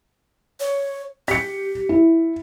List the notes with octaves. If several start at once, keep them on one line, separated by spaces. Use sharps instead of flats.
C#5
G4 B6 C#7
E4